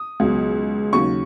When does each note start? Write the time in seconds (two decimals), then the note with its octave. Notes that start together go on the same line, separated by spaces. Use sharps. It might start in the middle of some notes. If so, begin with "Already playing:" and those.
Already playing: D#6
0.20 C#2 B2 F#3
0.93 D#2 C#3 F#3 C#6